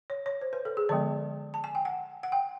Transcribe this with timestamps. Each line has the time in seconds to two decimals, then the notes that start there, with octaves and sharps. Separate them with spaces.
0.10 C#5
0.26 C#5
0.41 C5
0.53 B4
0.65 A4
0.77 G#4
0.89 D3 F3 G#3 B3 D5
1.54 A5
1.64 G#5
1.75 G5
1.85 F#5
2.23 F#5
2.32 G5